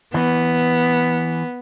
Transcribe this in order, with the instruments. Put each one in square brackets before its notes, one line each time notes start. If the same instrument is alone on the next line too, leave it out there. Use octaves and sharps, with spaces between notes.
[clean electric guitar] E3 [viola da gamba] B3